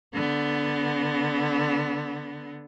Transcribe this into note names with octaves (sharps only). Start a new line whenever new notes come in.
D3 B3